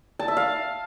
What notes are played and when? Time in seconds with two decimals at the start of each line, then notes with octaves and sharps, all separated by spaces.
0.19 A5
0.28 E5
0.37 F5